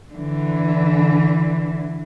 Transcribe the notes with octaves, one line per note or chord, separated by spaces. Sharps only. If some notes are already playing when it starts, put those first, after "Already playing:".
D3 E3